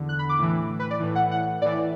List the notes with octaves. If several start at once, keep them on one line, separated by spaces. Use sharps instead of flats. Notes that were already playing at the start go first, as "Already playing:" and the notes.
Already playing: E2 D3
F#6
B5
D6
A2 E3
B4
D5
A2 E3
F#5
F#5
A2 E3 D5